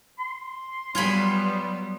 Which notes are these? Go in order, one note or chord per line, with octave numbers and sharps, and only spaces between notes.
C6
F#3 G3 B3 F4 G#5 B5